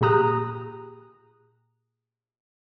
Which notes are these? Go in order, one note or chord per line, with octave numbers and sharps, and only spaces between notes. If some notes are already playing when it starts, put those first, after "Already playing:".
A#2 G4 G#4 A#5 D#6 F#6